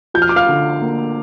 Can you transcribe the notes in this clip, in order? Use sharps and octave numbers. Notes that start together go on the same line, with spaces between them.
F3 G6
F6
D6
F5 F6
D3
A#3